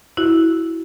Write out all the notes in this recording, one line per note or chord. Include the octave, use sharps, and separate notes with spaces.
E4 F#4